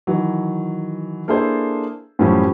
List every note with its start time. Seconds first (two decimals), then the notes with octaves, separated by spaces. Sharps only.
0.07 D#3 E3 F#3
1.28 A#3 D4 E4 G#4 A4 C5
2.19 F#2 A2 E3 F3 G3 C#4